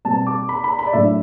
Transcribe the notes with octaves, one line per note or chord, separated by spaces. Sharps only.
B2 G3 C4 A5
D6
B5
B5
B5
D5
A2 F#3 A3 D4 E5